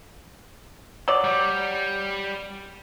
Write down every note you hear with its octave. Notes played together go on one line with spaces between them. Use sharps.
F#3 D5
G3